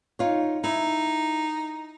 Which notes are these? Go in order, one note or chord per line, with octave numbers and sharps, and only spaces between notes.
D#4 F4 C#5
D#4 E4